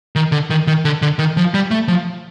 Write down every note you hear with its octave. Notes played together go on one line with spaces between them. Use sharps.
D#3
D3
D#3
D#3
D3
D3
D#3
F3
G3
A3
F3